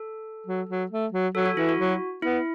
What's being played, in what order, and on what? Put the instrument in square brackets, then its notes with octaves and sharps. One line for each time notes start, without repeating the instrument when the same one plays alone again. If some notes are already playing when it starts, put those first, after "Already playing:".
Already playing: [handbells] A4
[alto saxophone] F#3
F#3
A3
F#3
[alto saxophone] F#3 [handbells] A4
[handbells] F#4
[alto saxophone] E3 [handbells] E4
[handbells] F#4
[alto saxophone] F#3
[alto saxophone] B3 [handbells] E4